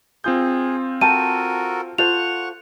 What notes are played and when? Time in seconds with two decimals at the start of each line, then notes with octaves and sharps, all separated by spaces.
0.24 C4 F4 G#4 G6
1.01 F#4 A4 A#4 G5 A5 D#7
1.98 F4 A4 C5 F#5 C#6 F7